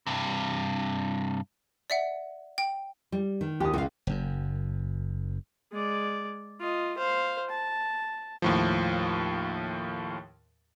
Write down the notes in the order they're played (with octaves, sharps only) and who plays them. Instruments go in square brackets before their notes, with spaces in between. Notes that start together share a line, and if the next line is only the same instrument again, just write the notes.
[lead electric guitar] G2 C3
[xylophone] D5 E5 F#5
G5
[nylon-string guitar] G3
D#3
[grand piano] D#2 D#6 [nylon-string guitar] G4
[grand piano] C#2 [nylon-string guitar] F#4 F5
[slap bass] F#1 F#2
[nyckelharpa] G#3 D5
F4 D#5
C5 F5
A5
[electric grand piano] D#2 A2 F3